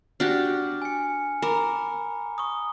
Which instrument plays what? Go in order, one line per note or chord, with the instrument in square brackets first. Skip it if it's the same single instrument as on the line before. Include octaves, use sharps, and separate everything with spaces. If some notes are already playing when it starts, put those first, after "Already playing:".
[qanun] D4 F#4 G4 [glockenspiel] F6
[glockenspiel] G#5 C#7
[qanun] A#4 [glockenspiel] A#5 B5 D6
[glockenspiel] C#6 D#6